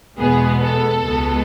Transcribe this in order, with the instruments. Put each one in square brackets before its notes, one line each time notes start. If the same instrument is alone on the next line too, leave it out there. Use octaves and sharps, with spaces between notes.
[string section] E2 B2 G#3 B3 G#4
A4
C#2 B2 G#3 B3